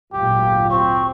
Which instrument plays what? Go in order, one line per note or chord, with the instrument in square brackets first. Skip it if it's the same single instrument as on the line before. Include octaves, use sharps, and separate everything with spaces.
[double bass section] G#1 D2 A#2 [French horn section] F#3 F4 [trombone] G4
[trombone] C4 [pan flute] C#6